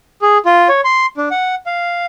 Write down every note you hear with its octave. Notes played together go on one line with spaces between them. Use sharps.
G#4
F4
C#5
C6
D4
F#5
F5